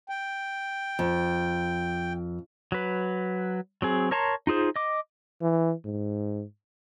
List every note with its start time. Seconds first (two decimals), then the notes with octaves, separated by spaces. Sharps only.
0.09 G5
0.99 F2
2.72 F#3 B4
3.82 F#3 C4 G#4
4.11 A#4 C#5 A5 A#5 C6
4.47 D#4 F4 G#4 C5
4.76 D#5 D6
5.42 E3
5.85 G#2